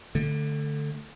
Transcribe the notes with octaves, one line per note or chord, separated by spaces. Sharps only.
D3 A3